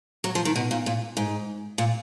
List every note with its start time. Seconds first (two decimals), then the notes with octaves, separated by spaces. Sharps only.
0.24 F#3
0.35 F3
0.45 D#3
0.56 B2
0.71 A#2
0.86 A#2
1.17 G#2
1.78 A#2